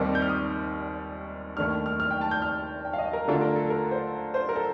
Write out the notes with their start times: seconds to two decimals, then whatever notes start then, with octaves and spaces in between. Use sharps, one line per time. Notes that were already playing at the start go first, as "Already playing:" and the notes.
Already playing: D#2 D#3 G3 C4 D#4 D6
0.15 G6
0.22 F6
0.29 D#6
1.57 D#2 D#3 A3 D4 F6
1.86 F6
2.00 F6
2.11 G5
2.21 A5
2.31 G6
2.42 F6
2.85 G5
2.93 F5
2.99 D#5
3.13 A#4
3.28 D3 A3 D4 F4 A4
3.41 A#4
3.56 A4
3.70 A#4
3.91 C5
4.34 C5
4.49 A#4
4.55 A4